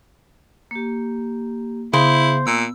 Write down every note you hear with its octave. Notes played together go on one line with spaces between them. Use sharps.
A#3 G4
C#3 B3 E4 C5
A#2 E6